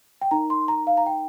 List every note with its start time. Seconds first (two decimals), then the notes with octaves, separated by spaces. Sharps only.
0.21 G5
0.31 D#4 A#4 A#5
0.50 C6
0.68 A#5
0.87 F5
0.97 A#5
1.06 G5